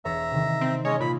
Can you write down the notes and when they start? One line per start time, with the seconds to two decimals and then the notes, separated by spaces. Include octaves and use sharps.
0.05 E1 C#5 E5 A#5 A6
0.32 C3 D#3
0.61 C4
0.85 G#3 C#4 C#5 D#5
1.00 A#2 B5 D#6